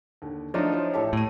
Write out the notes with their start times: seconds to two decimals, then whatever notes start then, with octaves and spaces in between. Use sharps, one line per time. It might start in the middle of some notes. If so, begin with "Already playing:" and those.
0.22 D#2 D3
0.54 F3 A3 D4 D#4 C#5 E5 A5
0.72 E4 F4 C5
0.94 A1 E4 G4 A4 C#5 E5
1.13 A2 E6 D#7